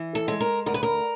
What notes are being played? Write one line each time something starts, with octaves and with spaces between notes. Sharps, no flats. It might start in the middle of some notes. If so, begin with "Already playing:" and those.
Already playing: E3
A4
G#3
A#4
D2 A#4
B4
A#4